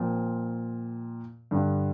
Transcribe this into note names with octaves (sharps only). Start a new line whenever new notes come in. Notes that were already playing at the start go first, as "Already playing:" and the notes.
Already playing: A#2 F3 C4
G2 D3 G3